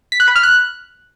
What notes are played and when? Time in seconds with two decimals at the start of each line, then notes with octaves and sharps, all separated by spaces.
0.12 B6
0.20 F#6
0.28 B5
0.36 F6
0.43 F#6